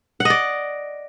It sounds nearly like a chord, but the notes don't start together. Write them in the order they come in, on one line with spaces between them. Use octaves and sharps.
F#5 D#5 D5